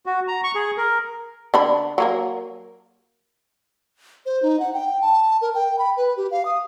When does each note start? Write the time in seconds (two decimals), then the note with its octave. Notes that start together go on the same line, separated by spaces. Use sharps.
0.06 F#4
0.28 A#5
0.44 C#6
0.55 G#4
0.77 A#4
1.54 D3 D4 B5
1.98 F#3 A#3 A#4
4.26 C5
4.43 D#4
4.60 F#5
4.74 G5
5.01 A5
5.41 A#4
5.55 G5
5.79 B5
5.97 B4
6.17 G4
6.31 F5
6.45 D#6